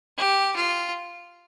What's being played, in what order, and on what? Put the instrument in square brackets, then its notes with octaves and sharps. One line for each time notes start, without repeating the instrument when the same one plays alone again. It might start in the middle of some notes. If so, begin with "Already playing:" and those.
[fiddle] G4
F4